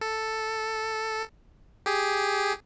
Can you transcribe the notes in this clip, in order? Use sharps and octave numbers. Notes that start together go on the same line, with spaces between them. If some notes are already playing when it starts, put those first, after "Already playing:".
A4
G4 G#4